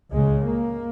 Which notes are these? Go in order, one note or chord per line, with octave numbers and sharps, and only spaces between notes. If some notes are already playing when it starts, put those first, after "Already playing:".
C#2 C#3 G#3
A#3